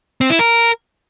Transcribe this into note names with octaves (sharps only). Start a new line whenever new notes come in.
C4
E4
A#4